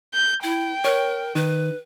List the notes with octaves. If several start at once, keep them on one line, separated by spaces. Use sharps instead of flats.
G6
E4 G5
A#4 C#5
D#3 B4